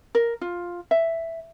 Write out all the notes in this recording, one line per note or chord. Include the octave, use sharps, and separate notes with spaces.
A#4
F4
E5